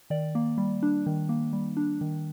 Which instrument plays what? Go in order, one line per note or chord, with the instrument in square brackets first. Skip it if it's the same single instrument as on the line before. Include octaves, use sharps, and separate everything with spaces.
[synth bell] D#3 D5
A#3
G3
D4
D#3
A#3
G3
D4
D#3